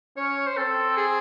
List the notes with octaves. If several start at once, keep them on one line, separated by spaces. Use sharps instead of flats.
C#4 C#5
C5
C4 A4
G#4